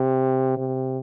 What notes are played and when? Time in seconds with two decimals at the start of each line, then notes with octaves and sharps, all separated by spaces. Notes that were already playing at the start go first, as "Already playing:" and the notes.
Already playing: C3
0.57 C3